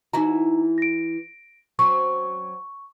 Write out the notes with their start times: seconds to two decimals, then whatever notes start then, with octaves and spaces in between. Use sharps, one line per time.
0.13 E3 D#4 E4 F#4 A#5
0.78 A#6 D7
1.79 F#3 C4 C#4 C#6